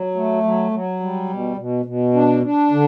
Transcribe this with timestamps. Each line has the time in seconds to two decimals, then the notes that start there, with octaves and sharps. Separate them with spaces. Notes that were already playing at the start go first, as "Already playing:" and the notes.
Already playing: F#3
0.15 A3
0.43 F#3
0.71 F#3
1.00 G3
1.29 B2
1.57 B2
1.85 B2
2.14 D4
2.43 D4
2.71 D3